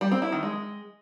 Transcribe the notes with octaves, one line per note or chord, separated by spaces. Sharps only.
G3
C4
E4
D#3
G#3